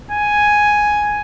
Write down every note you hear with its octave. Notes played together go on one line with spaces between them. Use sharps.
G#5